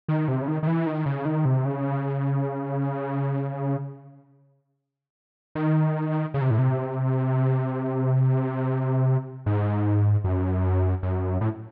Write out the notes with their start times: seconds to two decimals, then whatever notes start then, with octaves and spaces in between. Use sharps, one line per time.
0.08 D#3
0.28 C3
0.42 C#3
0.48 D#3
0.63 D#3
0.67 E3
0.87 D#3
1.06 C#3
1.25 D#3
1.45 C3
1.65 C#3
5.55 D#3
6.34 C#3
6.41 C3
6.51 A2
6.59 C3
9.46 G#2
10.24 F#2
11.03 F#2
11.41 A2